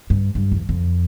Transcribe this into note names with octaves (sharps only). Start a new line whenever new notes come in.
G2
G2
E2
F2